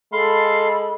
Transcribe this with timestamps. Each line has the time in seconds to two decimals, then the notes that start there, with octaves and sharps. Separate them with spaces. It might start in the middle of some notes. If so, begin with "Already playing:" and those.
0.13 G#3 A4 F5 B5 C6